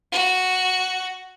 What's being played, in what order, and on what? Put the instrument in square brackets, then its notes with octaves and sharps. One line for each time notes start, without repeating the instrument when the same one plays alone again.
[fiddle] F#4